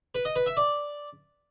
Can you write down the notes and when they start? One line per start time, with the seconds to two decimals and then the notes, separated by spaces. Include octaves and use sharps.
0.15 B4
0.25 D#5
0.36 B4
0.46 E5
0.57 D5